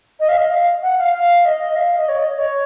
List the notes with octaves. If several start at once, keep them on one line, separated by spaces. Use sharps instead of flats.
D#5
F5
D#5
F5
F#5
F5
F5
D#5
F5
D#5
C#5
D#5
C#5